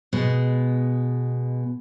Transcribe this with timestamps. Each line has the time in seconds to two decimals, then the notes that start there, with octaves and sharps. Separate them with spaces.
0.13 B2 G#3